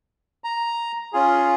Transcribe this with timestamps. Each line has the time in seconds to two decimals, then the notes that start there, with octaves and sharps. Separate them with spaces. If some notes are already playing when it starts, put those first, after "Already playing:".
0.44 A#5
1.13 C#4 F4 G#4